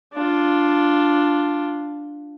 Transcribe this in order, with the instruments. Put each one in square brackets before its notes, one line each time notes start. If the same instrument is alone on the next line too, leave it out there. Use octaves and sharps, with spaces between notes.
[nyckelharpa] D4 F4